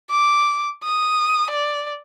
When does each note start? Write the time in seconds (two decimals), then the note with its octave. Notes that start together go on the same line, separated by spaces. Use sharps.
0.10 D6
0.84 D#6
1.51 D5